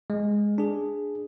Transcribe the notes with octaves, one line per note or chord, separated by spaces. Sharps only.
G#3
D4 G#4